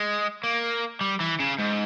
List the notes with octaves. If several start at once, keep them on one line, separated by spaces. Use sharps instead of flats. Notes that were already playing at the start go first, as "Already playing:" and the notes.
Already playing: G#3
A#3
G3
E3
C#3
G#2